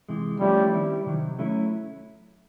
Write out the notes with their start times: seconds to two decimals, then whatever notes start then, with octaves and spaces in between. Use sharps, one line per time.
0.09 C3 E3 G#3
0.40 F3 G3 A3 C#4 E4
0.73 D#3 G3 C4 E4
1.06 C3 D#3 F#3
1.39 F#3 A3 C#4 E4